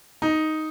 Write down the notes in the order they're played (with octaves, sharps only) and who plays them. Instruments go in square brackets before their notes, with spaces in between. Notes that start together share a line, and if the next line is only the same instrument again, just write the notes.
[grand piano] D#4